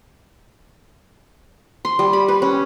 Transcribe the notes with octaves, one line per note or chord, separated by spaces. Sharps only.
C6
G3
B5
B4
C#4